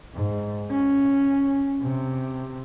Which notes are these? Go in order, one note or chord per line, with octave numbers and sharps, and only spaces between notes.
G#2
C#4
C3